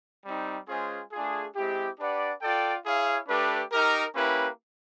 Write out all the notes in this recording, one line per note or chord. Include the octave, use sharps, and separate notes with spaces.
G3 C4 D#4
G#3 C#4 F4 G#4 C5
A3 D4 F4 G#4
G#3 C4 E4 G4
D4 G4 B4 D5 F#5
F4 A4 D5 G5
E4 G#4 C#5 F5
A3 D4 G4 B4
D#4 G4 A#4
A#3 C#4 E4 G4 B4